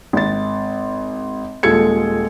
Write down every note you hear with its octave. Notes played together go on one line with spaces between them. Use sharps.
G#1 A6
D#1 G#3 F4 A4 G#6 C#7